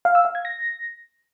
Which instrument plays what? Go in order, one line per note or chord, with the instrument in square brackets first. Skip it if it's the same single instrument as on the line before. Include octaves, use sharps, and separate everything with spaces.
[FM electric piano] F5
E6
F5
G#6
A#6